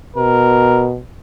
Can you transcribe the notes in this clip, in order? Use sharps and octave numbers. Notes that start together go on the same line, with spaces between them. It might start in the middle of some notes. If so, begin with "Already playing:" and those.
B2 A#4